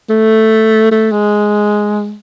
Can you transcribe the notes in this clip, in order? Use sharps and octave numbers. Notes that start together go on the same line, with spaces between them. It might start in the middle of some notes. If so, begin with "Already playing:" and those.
A3
A3
G#3